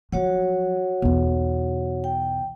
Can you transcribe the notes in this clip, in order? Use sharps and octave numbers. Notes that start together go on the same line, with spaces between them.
F3 F#3 F#4 C#5 F#5
B1 E2
G5